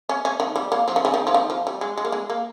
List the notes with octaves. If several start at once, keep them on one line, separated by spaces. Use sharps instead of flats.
C#4
C#4
D#3
G3
A#3
F3
D#3
C#3
D#3
F3
D#3
F3
G3
G#3
G#3
A#3
G#3
A#3